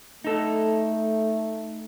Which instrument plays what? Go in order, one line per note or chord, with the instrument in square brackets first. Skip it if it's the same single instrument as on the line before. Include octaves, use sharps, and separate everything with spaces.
[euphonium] A3 [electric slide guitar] D#4 A4